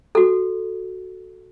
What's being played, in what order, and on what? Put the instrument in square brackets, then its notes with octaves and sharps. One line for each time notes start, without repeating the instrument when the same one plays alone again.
[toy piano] F#4 A4